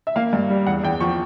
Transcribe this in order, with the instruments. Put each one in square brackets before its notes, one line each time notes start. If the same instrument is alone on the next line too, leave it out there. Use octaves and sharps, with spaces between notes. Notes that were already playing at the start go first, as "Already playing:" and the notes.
[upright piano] E5
A#3 F5
G2
G3
E2 F#5
E2 G5
F3 C#6